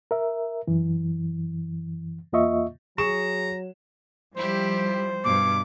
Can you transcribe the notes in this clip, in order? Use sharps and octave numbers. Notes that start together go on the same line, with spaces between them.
A#4 E5
F#2 E3
E2 A#3 F4 D#5 E5 C#6
F#3 G#4 A#5 C#6 E7
F3 G3 E4 G4 C5
G2 B2 D6